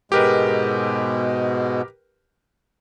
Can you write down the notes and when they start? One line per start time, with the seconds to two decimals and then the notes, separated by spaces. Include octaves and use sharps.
0.12 G#2 B2 G#3 G4 A#4 B4